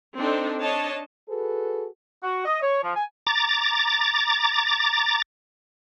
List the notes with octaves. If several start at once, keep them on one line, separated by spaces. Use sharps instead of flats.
C4 D4 D#4 A4
D4 C#5 D#5 A5
F#4 G#4 A4 B4
F#4
D#5
C#5
F3
G#5
A#5 D6 A6